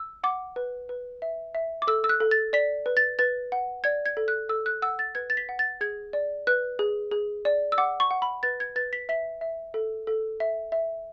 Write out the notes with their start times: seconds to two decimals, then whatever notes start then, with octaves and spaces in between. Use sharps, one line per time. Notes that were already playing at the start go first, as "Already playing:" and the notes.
Already playing: E6
0.24 F#5 D6
0.56 B4
0.89 B4
1.22 E5
1.55 E5
1.82 D6
1.87 A4 E6
2.04 E6
2.09 F#6
2.20 A4
2.31 A6
2.53 D5 B6
2.86 B4
2.97 A6
3.19 B4 A6
3.52 F#5
3.84 D5 G#6
4.06 G#6
4.17 A4
4.28 F#6
4.49 A4 E6
4.66 F#6
4.82 F#5 E6
4.99 A6
5.15 B4 G#6
5.30 A6
5.37 B6
5.49 F#5
5.59 A6
5.81 G#4 G#6
6.13 D5
6.47 B4 F#6
6.79 G#4
7.11 G#4
7.45 D5
7.72 E6
7.78 F#5 D6
8.00 C#6
8.11 F#5
8.22 B5
8.43 B4 A6
8.60 G#6
8.76 B4 A6
8.93 B6
9.09 E5 B6
9.41 E5
9.74 A4
10.07 A4
10.40 E5
10.72 E5